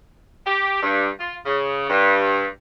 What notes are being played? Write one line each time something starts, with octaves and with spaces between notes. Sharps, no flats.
G4
G2
F4
C#3
G2